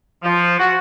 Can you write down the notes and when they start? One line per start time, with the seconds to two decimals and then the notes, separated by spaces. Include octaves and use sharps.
0.24 F3
0.59 F#4